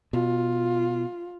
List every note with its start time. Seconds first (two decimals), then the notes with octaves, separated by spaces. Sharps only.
0.13 B2 F4